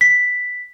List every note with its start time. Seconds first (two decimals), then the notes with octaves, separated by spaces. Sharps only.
0.01 B6